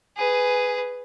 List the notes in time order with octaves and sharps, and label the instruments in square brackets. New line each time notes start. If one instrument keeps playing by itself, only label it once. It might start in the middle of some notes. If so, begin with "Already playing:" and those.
[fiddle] G#4 B4